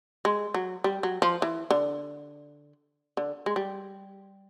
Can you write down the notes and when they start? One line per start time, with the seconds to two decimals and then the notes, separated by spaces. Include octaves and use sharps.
0.25 G#3
0.54 F#3
0.84 G3
1.03 F#3
1.22 F3
1.42 E3
1.71 D3
3.17 D3
3.46 G#3
3.56 G3